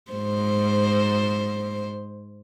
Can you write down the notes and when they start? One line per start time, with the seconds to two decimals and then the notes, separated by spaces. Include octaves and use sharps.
0.12 G#2 C5